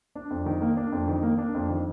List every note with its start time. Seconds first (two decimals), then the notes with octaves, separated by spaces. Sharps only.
0.15 D4
0.30 F2
0.46 D#3
0.62 A#3
0.77 D4
0.92 F2
1.08 D#3
1.23 A#3
1.38 D4
1.55 F2
1.70 D#3